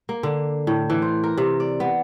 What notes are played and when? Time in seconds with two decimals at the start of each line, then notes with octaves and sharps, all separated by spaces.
0.09 A#3
0.23 D3
0.67 A2
0.90 E3
1.02 C5
1.24 A#4
1.38 C3
1.60 D5
1.80 B3